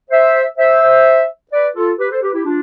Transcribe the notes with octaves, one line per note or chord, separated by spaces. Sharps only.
C5 E5
C5 E5
B4 D5
F4 A4
G4 B4
A4 C5
G4 B4
E4 G4
D4 F4